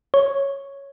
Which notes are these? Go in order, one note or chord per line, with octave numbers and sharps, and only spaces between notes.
C#5